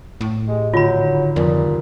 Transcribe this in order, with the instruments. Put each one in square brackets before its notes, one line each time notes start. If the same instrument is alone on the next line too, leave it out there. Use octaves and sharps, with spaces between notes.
[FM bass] A2
[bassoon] G#3 [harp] G4
[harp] G#1 D3 G6 [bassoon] F#3 [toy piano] F4 B5
[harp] C2 B4 D#6 [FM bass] F2 [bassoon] A#2